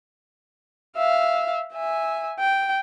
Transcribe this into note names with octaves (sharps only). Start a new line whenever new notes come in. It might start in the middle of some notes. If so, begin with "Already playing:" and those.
E5 F5
E5 G#5
G5